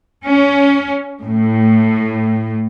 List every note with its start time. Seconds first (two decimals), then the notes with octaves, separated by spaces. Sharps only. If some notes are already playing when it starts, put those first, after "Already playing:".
0.26 C#4
1.21 A2